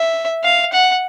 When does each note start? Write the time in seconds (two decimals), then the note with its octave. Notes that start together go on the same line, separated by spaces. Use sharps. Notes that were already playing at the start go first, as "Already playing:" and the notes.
Already playing: E5
0.44 F5
0.73 F#5